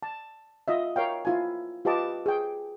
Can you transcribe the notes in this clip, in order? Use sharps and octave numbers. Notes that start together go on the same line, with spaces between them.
A5
F4 D#5 E5
A#4 C#5 F5 G5
E4 F4 G#5
F4 G4 B4 D#5 A5 D6
G#4 G5